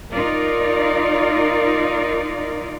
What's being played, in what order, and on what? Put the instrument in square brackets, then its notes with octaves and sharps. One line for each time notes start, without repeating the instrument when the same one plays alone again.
[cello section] D#4 F4 A#4 D5